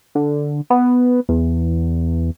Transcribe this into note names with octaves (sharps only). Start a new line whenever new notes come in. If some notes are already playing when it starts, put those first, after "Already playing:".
D3
B3
E2